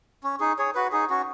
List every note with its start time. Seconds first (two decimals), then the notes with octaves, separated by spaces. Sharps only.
0.23 C#4
0.40 D#4 G#4
0.58 G#4 C#5
0.75 F#4 B4
0.92 D#4 G#4
1.10 C#4 F#4